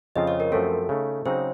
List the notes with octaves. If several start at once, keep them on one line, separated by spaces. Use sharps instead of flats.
F2 C#3 F3 C4 F4 D#5
C#5
A#4
F#2 F3 A3 C4 A4
C#3 A3 D#4
C#3 F#3 C4 D#4 C5